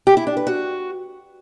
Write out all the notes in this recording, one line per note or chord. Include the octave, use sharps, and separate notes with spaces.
G4
E4
D4
B4
F#4